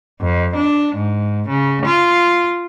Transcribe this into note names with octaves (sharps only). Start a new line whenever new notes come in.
F2
D4
G#2
C#3
F4